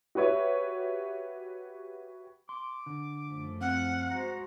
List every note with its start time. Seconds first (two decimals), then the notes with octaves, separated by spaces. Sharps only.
0.15 F#4 G4 B4 C#5 E5
2.49 C6 D6
2.86 D3
3.26 F#2 F3 A3
3.61 C4 F5 F#5
4.10 G#3 F#4 C5 A#5